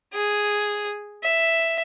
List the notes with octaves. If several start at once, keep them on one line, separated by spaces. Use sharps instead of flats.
G#4
E5